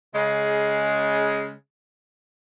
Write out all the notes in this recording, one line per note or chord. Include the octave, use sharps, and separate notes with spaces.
C#3 G#3